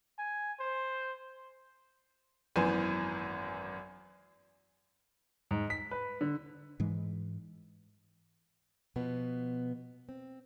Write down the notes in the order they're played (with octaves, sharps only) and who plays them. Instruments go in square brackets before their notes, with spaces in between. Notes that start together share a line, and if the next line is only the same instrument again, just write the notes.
[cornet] G#5
C5
[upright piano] G#1 F#2 E3 B3 C5 G#5
[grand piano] G#2
B6
B4
D3
[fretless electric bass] G#2 E3 G#3
[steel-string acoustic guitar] B2 F3 B3
C4